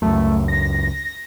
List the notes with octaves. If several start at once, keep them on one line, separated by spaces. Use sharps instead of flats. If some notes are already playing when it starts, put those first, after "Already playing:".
C#2 F#2 A3
A#6